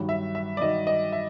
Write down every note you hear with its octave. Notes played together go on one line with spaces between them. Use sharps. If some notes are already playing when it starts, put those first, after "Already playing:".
Already playing: G2 D#3 F#3
E5
E5
D5
G2 D#3 F#3 D#5
D#5
E5